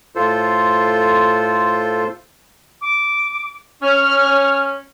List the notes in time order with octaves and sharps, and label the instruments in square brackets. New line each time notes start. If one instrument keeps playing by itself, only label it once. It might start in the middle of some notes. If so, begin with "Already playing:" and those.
[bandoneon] A2 F4 A4 C5
[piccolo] D6
[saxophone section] C#4 [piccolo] F6